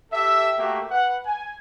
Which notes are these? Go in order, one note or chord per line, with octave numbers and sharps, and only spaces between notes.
G4 A4 E5
A3 A#3 F#4 G4 E5
B4 F#5
G#5